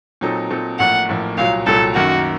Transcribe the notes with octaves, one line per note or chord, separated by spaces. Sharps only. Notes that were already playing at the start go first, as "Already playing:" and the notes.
A#2 F#3 C4 D#4 A4
A#2 F#3 C4 D#4 A4
A1 A2 F3 A#3 F#5
A1 A2 F3 A#3
C2 A#2 F#3 F5
C2 A#2 F#3 A4
F#2 D#3 A#3 F#4